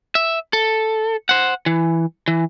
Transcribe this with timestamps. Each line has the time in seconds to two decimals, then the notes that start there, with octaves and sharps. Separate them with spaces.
0.15 E5
0.53 A4
1.29 C5 F#5
1.66 E3
2.28 E3